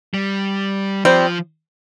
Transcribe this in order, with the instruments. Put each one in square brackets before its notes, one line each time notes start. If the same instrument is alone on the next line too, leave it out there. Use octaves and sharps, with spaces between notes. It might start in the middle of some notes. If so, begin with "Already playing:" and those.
[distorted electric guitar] G3
[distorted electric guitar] F3 [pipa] G3 C4